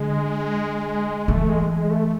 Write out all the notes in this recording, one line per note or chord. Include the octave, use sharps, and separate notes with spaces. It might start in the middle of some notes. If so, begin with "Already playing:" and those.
Already playing: D3 G#3
E3 A3
G#3
G#3
A3